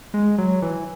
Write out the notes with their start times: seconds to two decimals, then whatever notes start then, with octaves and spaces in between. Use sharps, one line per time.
0.14 G#3
0.38 F#3
0.62 E3